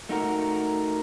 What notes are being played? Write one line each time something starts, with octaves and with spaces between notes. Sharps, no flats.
A3 D#4 F#4 A#4